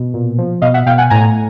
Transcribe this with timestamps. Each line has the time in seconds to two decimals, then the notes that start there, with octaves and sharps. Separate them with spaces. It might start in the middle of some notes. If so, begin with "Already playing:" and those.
Already playing: B2
0.14 A#2
0.38 F3
0.62 B2 D#5 F5
0.74 E5 F#5
0.86 B2 F5 G5
0.98 F#5 G#5
1.10 A2 G#5 A#5